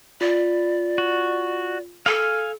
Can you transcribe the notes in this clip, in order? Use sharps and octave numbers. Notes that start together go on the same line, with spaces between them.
F4 D5
F#4
A4 F5 G#5 F6